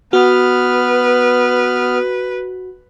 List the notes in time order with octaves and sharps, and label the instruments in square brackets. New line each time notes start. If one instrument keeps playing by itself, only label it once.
[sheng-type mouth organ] B3 F6 [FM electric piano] F#4 [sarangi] B4